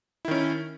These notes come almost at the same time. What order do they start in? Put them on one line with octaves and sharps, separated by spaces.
E4 D#3 C#4